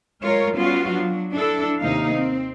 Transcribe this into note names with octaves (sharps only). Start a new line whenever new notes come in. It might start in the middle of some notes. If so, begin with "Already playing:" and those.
G#3 F4 A#4 C#5
G3 B3 C#4 F4 F#4
F#3 D4
D4 E4 A4
D#2 C3 A#3 D#4 F5
C4